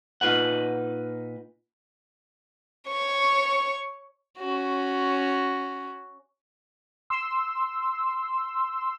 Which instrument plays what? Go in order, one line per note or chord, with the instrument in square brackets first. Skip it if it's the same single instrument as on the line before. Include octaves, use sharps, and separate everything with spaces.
[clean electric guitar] A#2 D#4 F4 A#4 B4 F#5
[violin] C#5 C#6
[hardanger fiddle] C#4 F#4
[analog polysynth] C6 E6